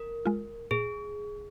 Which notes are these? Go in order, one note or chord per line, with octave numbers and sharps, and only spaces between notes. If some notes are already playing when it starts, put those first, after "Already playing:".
Already playing: A#4
G#3 F4
A#2 G#4